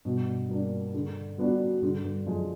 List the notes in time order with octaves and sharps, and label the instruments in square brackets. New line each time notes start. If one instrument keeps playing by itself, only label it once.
[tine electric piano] G2 [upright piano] B2
[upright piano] G3 A#3 D4
D3
G3 B3 D4 F#4
[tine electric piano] G2 [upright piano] D3
[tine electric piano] G2
[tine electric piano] F#2 [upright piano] F3 G#3